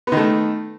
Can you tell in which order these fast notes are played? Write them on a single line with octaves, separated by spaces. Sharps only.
B3 D#3 A3